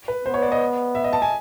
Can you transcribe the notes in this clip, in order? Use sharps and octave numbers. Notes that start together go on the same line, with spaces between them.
B4
B3 C5
C#5
D5
D#5
E5
D#5
A5
G#5